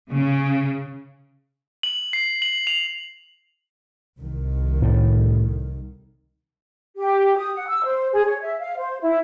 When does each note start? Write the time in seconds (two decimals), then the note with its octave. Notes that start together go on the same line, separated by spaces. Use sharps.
0.12 C#3
1.83 F#7
2.13 C7
2.42 F#7
2.67 F7
4.19 C2 D#3
4.82 A2
6.97 G4
7.37 D#6
7.56 F#5
7.68 E6
7.84 C5
8.13 G#4
8.26 C#5
8.42 E5
8.60 F5
8.78 C5
9.02 E4